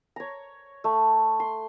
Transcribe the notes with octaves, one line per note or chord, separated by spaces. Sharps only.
C#5 A#5
A3
C6